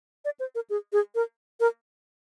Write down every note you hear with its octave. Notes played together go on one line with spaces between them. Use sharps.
D5
C5
A#4
G#4
G#4
A#4
A#4